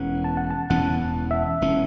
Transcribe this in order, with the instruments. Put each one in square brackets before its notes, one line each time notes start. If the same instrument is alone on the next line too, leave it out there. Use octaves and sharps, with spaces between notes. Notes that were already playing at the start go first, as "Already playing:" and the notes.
Already playing: [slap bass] E1 E2 E3 C#4 [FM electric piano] F#5
[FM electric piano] A5
F#5
A5
[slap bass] E1 E2 E3 C#4 [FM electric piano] F#5
[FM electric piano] E5
[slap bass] E1 E3 C#4